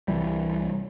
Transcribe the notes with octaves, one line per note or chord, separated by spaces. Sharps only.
C2 E3 G3